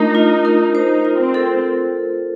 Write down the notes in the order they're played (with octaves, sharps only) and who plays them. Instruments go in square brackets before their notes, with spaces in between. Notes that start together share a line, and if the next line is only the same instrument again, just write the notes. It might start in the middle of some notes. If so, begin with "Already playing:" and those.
Already playing: [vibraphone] A3 D4 F4 A#4 [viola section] D#4
[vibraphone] F4
A#4
[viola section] D#4 [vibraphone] C5
[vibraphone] F4
[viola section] C4
[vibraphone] A4